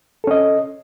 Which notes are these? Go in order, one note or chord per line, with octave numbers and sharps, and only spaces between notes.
C#4 A4 D#5